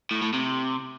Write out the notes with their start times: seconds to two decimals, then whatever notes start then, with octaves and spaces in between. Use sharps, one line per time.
0.11 A2
0.22 A2
0.33 C3